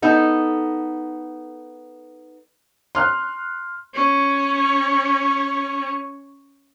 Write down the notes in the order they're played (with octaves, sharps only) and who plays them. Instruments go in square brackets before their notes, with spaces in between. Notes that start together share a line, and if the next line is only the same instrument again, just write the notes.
[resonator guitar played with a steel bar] B3 D#4 A4
[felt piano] C6 F6 F#6
[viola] C#4 C#5